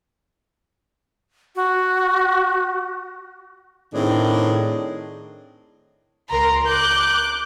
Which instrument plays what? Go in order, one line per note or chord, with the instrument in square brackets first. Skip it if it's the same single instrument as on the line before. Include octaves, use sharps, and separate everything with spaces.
[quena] F#4
[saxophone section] A2 D#3 C4 D4 G#4
[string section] C#2 A#4 C6 [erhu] A#5
[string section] D6 F#6 [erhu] G6